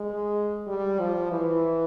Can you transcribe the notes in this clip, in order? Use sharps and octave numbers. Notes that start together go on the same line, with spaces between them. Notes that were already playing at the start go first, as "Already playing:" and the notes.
Already playing: G#3
G3
F3
E3